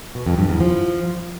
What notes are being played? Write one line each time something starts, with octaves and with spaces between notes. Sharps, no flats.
B2
F2
G2
E2
F3